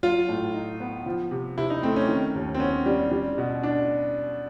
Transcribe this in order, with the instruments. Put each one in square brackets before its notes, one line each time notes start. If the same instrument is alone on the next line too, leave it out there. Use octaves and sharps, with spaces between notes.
[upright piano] F#3 [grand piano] F4
[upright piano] A2
D#4
B3
F3
C3
[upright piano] C3 [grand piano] E4
[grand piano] D#4
[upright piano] A3 [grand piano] C4
[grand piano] C#4
[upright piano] D#3
D#2
[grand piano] C4
[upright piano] B3 [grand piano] C#4
[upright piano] G3
G3
B2
D4